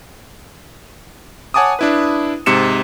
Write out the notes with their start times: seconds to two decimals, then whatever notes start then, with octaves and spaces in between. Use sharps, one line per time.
1.54 C#5 F#5 G#5 A5 D6 D#6
1.79 D4 E4 B4
2.46 G#2 C3 C#7 E7